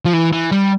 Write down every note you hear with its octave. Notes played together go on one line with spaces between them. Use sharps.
F3
E3
E3
G3